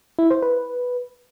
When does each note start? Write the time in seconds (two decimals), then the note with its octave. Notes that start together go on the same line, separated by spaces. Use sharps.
0.19 E4
0.31 C5
0.42 B4